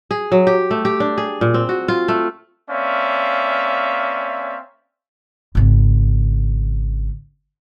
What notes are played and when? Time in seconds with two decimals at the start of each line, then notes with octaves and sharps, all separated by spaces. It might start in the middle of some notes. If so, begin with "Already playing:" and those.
0.11 G#4
0.32 F#3
0.47 G4
0.71 A3
0.85 G4
1.00 D4
1.18 G#4
1.41 A#2
1.54 C4
1.69 F#4
1.88 F4
2.08 A3
2.69 A#3 C4 C#4 D5 E5 F5
5.55 G#1 C#3